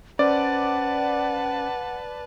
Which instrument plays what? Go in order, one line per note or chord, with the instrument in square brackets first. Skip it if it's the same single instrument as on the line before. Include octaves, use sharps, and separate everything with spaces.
[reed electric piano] C#4 C5 [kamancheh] B4 A5 [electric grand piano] D5 [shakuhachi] F#5